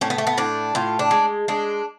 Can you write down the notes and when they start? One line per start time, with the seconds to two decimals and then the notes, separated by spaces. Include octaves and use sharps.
0.01 A2 C#4
0.10 B3
0.18 A3
0.27 B3
0.38 A2 D4
0.75 A2 F4
0.99 D4
1.11 G#3
1.48 G#3 D4